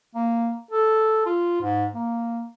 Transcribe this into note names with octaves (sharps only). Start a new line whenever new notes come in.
A#3
A4
F4
G#2
A#3